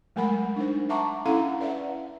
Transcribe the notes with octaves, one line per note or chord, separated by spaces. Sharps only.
F#3 G#3 A3 A#4 F#5 B5
D4 D#4 C5
E5 F#5 A5 A#5 C#6 D6
C#4 E4 A4 F5 F#5 A#5
B4 D5 E5 F#5